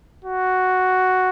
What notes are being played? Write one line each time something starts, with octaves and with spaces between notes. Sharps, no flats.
F#4